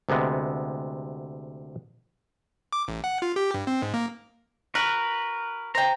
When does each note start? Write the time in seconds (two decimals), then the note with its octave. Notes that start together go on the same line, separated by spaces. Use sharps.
0.09 D2 C3 G#3 B3
2.73 D6
2.88 A1
3.04 F#5
3.22 F4
3.36 G4
3.54 G2
3.67 C4
3.82 G#2
3.94 A#3
4.75 F#4 A#4 B4
5.75 C5 G5 A#5